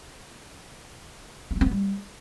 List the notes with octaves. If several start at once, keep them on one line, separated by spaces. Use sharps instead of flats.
B3
A3
C4
B3
G3